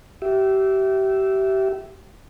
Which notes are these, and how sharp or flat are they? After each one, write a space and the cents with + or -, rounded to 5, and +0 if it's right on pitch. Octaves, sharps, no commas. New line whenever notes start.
G4 -30 E5 +0